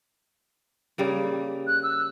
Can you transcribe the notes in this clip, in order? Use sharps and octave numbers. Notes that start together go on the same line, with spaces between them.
C#3 G3 A#3
F#6
E6